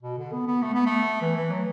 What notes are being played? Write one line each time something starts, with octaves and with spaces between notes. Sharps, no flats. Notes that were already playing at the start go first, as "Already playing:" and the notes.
B2
D3
B3
B3
A3
B3
A3
E3
E3
F#3